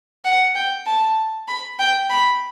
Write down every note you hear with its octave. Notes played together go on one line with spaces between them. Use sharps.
F#5
G5
A5
B5
G5
B5